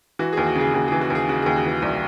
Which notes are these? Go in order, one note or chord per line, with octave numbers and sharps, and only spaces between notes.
E3 F#4
D#2 G#4
F#4
C#3
G#4
D#2 F#4
E3 G#4
F#4
D#2 G#4
C#3 F#4
D#2 G#4
F#4
E3
C2